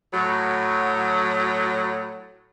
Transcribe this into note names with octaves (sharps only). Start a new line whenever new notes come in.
A2 F#3